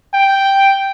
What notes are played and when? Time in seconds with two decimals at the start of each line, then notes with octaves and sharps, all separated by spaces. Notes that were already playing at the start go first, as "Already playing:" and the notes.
0.14 G5